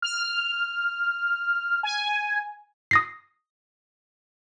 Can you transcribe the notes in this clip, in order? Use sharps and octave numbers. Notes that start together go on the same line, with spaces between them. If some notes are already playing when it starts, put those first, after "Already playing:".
F6
G#5
D#6 A#6 C7